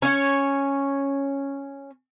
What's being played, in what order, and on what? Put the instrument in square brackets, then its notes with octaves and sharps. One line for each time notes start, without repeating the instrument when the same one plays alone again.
[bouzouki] C#4 C#5